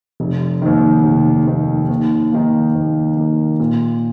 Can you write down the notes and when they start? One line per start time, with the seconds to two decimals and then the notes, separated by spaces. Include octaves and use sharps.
0.20 F1
0.62 D#2 D#3
1.05 F1
1.47 D#2 D#3
1.89 D#2
2.32 D#3 A#3
2.75 D#2
3.17 D#3 A#3
3.60 A#2